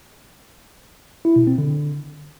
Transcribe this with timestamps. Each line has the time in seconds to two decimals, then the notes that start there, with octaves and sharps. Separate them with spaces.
1.25 E4
1.36 B2
1.47 C4
1.58 D3